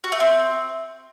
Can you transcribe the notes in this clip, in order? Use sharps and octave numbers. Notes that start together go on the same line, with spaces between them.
F#4
A3
C4